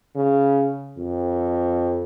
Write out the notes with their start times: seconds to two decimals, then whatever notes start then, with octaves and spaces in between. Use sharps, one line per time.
0.15 C#3
0.98 F2